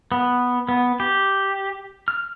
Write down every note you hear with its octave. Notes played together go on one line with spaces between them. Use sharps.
B3
B3
G4
F6